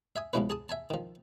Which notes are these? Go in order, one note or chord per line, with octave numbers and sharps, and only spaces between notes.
E5 G#5 D#6
C#2 B2 F3 C#4 E4 B4
G#4 A5 D#6
E5 G#5 A5
D#3 F3